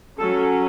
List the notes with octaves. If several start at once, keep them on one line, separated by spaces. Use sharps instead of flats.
F#3 C#4 A4